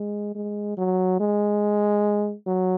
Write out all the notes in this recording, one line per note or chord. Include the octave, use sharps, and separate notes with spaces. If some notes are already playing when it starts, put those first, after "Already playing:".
Already playing: G#3
G#3
F#3
G#3
F#3